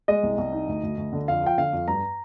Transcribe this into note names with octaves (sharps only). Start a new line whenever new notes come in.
G#3 D#5
C2
C2
D#4
D2
D2
D2
D3
F2 F5
F3 G5
D3 F5
F2
G2 A#5